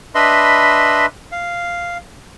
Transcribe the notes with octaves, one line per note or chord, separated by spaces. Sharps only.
D4 B4 D#5 E5 B5 C6
F5